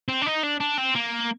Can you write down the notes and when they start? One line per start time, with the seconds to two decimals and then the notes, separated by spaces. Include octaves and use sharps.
0.09 C4
0.21 D4
0.26 D#4
0.43 D4
0.60 D4
0.78 C4
0.95 A#3